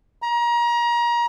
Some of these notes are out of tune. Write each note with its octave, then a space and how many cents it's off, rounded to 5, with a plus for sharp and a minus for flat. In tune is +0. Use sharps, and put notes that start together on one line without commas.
A#5 +30